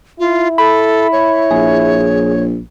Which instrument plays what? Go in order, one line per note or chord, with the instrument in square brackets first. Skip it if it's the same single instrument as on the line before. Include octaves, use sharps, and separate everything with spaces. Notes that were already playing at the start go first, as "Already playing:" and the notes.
[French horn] E4 [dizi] F4
[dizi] A4 [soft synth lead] B5
[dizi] C#5
[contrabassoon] A#1 [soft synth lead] G#4